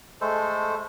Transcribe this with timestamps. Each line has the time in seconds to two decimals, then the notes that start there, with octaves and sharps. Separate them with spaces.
0.21 G#3 A3 A4 C5